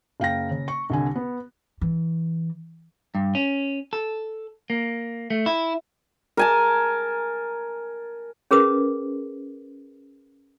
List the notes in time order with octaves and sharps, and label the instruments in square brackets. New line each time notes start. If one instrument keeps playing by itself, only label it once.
[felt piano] F#1 F5 G5 A#6
C#3
C#6
C2 D3 G#5
B3
[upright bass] E3
[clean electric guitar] G2
C#4
A4
A#3
A3
E4
[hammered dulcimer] A#4 G#5 A5
[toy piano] C#4 G#4 A#4 B4 D#6